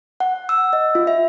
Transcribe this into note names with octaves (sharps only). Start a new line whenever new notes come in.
F#5
E6
D#5
F4
E5